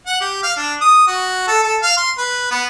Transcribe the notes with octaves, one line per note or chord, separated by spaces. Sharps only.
F#5
G4
F5
D4
D#6
F#4
A4
A4
F5
C6
B4
B3